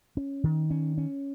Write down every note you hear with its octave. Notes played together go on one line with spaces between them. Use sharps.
C#4
D#3
C#4
C#4